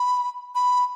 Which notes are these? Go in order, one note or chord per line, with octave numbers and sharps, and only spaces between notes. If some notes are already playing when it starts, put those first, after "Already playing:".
Already playing: B5
B5